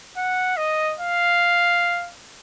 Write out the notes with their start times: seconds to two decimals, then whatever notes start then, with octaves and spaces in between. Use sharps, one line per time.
0.17 F#5
0.57 D#5
0.99 F5